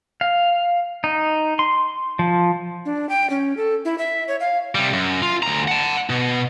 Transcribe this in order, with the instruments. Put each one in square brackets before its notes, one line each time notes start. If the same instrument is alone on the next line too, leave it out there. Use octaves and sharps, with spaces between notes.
[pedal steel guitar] F5
D#4
C6
F3
[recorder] D4
G5
C#4
A4
E4
E5
C#5
F5
[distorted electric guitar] C3 G3
F#2
F4
D2 A#5
F#5 A5
B2